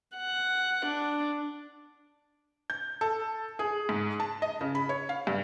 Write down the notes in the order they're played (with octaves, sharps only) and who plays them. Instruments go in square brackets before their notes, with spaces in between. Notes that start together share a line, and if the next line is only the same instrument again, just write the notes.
[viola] F#5
D4
[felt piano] G6
A4
G#4
G#2
A5
D#5
C#3
B5
C#5
F5
G2